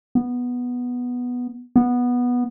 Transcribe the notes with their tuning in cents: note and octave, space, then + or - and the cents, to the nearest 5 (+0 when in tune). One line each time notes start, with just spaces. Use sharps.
B3 -5
B3 -10